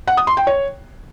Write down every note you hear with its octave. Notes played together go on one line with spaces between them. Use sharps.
F#5
D#6
C6
G5
C#5